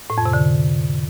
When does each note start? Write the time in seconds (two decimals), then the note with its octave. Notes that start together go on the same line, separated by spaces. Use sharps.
0.10 A2
0.18 F2
0.26 C3
0.33 D3